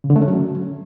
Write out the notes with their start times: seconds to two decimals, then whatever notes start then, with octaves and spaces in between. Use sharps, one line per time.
0.04 C#3
0.10 D3
0.16 A3
0.22 C#4
0.28 F#3